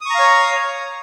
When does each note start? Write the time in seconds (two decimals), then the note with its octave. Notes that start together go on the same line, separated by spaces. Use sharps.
0.01 D#6
0.06 C#6
0.10 A#5
0.15 F5
0.19 C#5